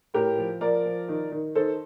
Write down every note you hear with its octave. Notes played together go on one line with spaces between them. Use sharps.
A2 G4 A#4
F3
F3 A#4 D5
F3
D#3
D#3
D#3 A4 C5